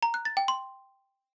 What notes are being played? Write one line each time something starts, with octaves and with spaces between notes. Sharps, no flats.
A#5
F#6
A6
G5
C6